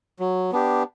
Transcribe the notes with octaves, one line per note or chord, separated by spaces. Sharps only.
F#3
B3 D4 G4